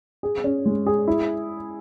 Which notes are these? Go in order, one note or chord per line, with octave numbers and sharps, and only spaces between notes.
G#4
C#4
G#3
G#4
E4